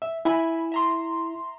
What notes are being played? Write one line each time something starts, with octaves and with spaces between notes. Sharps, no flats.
E5
E4 E5 G#5 B5
E5 A#5 C6